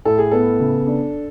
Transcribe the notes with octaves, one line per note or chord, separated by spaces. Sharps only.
A2 A4
G#4
B3 A4
C#3
D4